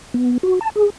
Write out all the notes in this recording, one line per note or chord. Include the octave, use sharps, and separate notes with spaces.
B3
F#4
A5
G#4